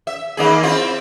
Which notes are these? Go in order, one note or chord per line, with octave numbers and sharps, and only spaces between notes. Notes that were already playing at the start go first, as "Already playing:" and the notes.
E5
D#3 A#3 G#4
C4 E4 F4